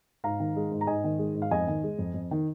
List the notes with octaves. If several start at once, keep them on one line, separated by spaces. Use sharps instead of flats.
G#2 F5 A#5
D#3
G#3
G#2
A#5
G#2 D#5 G#5
D#3
G#3
G#2
F5
F2 D#5 G#5
D#3
G#3
F2
F2
D#3